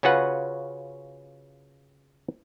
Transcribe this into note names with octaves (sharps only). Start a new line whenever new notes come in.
C#3 C#4 F4 F#4 B4 F#5